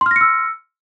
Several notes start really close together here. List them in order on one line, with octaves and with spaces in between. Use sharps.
C6 F6 A#6 C#7 E6